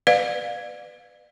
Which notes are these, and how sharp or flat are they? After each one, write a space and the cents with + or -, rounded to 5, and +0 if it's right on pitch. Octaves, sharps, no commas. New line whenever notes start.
B4 +25 D5 +30 F5 +25